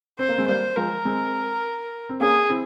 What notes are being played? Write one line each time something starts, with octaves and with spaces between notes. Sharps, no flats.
C4 C5
A#3
G#3 C4
G3 A#3 C5
F3 G#3 A#4
G#3 C4
C4
A#3 C#4 G#4
C4 E4